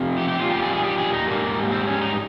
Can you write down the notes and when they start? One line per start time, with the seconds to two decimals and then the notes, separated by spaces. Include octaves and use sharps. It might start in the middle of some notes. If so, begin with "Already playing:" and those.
Already playing: F2 C3
0.18 G4
0.28 G4
0.40 A#2 G3 F4
0.51 G4
0.62 G#4
0.73 G#4
0.84 G4
0.98 G#4
1.13 D#4
1.27 G#2 G3 A#3
1.71 C4
1.87 C#4
2.01 D#4